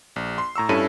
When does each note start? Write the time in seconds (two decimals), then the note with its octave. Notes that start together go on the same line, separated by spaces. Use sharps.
0.16 A#1
0.38 C6
0.56 A2 A#5 C#6 E6
0.69 G2 C#4 E4 A4 D#7